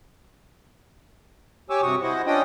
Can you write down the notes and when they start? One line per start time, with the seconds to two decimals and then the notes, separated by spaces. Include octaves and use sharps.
1.70 G4 C#5 G#5 C#6 D6 E6
1.82 G2 C3 F#4 C#6 D#6
2.02 E4 C5 D#5 F#5
2.27 C#4 D4 F4 D#5 G5 D#6